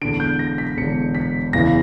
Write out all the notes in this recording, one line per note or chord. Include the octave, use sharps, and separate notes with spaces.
E1 E2 D3 D7
G6
A#6
B6
E1 E2 D3 C#7
B6
F#1 E2 C#3 E3 A#6